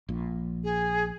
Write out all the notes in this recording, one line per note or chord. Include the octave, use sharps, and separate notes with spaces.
A#1 A#2
G#4